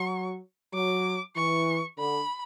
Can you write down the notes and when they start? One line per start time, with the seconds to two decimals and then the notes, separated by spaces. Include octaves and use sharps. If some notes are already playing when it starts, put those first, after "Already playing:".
Already playing: F#3 C#6
0.73 F#3 D6
1.36 E3 C#6
1.98 D3 B5